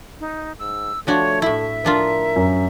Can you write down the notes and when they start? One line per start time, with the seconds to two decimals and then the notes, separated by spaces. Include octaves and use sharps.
0.20 D#4
0.59 G#2 E6
1.07 F3 A3 D4 F#4 C#5
1.42 A2 E4 E5
1.85 F3 D4 F4 A#4
2.36 F#2